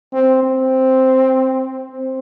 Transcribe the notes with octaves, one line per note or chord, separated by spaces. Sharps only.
C4
C4
C4